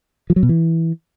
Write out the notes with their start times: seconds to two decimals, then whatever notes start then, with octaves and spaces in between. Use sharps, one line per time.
0.30 F3
0.36 F#3
0.43 B2
0.49 E3